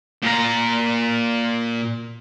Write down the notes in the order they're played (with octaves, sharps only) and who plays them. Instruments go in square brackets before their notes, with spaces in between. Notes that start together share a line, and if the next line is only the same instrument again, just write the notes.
[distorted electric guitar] A#2 A#5